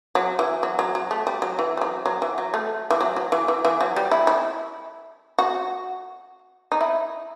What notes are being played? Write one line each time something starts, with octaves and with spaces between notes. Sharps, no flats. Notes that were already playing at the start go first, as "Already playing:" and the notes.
F#3
E3
F#3
F#3
F#3
A3
G3
F#3
E3
G3
F#3
F#3
E3
F#3
A3
E3
F#3
F#3
E3
E3
E3
F#3
G3
E4
E4
F#4
D#4
E4